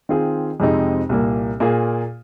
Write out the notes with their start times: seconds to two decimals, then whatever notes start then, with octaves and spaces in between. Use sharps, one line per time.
0.09 D#3 C4 F4 G#4
0.60 F2 C3 G#3 C4 D#4
1.09 C2 A#2 A#3
1.60 A#2 A#3 F4 G#4